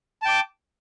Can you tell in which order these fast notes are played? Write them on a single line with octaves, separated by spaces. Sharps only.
A5 G5 D6